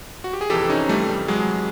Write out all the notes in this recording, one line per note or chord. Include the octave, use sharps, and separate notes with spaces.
F#4
G4
G#4
F2 C3 E3 G4 A4
C#4 D#4
G3 A3
G3
F#3 G#3